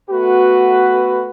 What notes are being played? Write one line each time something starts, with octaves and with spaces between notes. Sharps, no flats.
A3 B3 F#4 B4